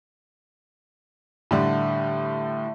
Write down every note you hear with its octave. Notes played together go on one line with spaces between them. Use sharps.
A2 D3 G3 E5 A5